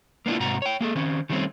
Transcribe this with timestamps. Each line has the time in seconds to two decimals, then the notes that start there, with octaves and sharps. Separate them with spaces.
0.26 A#3 B3 D4 E4 F4
0.40 G#2 C3 F#4 A#5
0.62 C#5 G5
0.81 A#3 G#4 A4
0.95 D#3 C4 C#4
1.30 D#3 F#3 G3 A3 C4 C#4